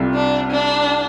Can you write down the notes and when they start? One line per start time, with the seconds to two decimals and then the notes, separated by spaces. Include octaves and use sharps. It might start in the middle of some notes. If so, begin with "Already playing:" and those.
Already playing: C2 C3 G3 F4 A4
0.15 D4
0.51 D4